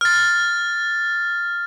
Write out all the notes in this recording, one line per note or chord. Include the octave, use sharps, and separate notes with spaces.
F6 A6